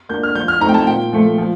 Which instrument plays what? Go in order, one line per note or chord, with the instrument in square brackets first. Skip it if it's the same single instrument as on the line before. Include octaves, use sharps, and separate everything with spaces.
[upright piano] A#3 D4 G6
F6
F3 G6
F6
A3 C4 D#4 A#5
G5
A5
A#2 G5
F3 A3
F3